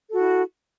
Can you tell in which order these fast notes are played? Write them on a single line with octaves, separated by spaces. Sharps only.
A4 F#4 E4